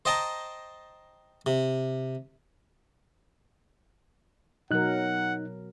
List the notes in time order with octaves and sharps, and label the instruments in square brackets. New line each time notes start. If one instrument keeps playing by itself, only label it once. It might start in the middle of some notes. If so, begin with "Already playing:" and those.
[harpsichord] C5 D#5 G5 A5 A#5
C3
[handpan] B2 F#3 A#4 [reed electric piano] D#4 F#6 [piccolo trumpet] F#5